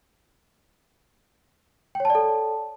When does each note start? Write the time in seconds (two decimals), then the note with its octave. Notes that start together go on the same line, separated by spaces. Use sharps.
1.95 G5
2.00 C#5
2.05 A5
2.10 D5
2.15 A4